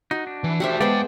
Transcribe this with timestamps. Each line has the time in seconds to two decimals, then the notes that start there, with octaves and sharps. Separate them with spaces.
0.11 D#4 F#4
0.27 D4
0.44 E3
0.60 F#4 G4 A4 C5 E5
0.81 G#3 B3 G#4 C5 D5 F5 G5